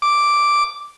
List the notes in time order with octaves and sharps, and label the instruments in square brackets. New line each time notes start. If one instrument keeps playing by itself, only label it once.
[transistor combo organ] D6